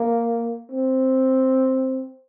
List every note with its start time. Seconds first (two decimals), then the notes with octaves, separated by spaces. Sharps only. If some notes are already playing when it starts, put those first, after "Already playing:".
Already playing: A#3
0.71 C4